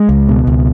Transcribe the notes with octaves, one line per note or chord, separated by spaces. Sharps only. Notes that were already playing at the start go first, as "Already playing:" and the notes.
Already playing: G#3
C#2
B2
C#2